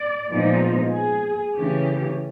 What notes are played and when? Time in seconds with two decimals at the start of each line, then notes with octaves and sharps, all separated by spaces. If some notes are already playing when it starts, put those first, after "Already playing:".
Already playing: D5
0.29 A#2 F3 G#3 B3 D#4
0.93 G#4
1.56 C#3 E3 A3 C#4 G4